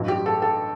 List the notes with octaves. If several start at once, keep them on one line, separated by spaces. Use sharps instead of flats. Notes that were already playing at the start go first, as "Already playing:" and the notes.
Already playing: A1 G2 F#3
G4
A4
A4